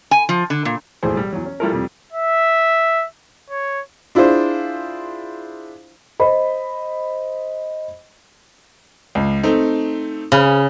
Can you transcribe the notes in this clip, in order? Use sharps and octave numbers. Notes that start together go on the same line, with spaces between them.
G#5
F3
D3
A#2
E1 A#1 A2 G#4 C5
G3
E2 F#3
C#4
E3 G3 E4 F4 A4 A#4
F2 C3 F3 G3
E5
C#5
D4 E4 F4 G#4 C5
C5 D#5 B5
C#2
A3 C4 D#4
C#3 G#5 B5 F6